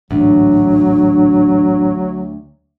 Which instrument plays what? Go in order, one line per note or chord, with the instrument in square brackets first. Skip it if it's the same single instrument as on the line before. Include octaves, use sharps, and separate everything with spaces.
[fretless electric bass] A1 G#2 [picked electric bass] D2 [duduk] F#3 [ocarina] D4